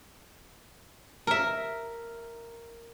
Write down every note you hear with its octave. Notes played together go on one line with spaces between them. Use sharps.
A#4 E5